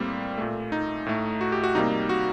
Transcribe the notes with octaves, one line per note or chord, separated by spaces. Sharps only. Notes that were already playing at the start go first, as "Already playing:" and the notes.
Already playing: A2 G3 A#3 C4
A#2 A3
D#4
A2 A3
F#4
G4
F#4
C3 G3 A#3 D#4
F#4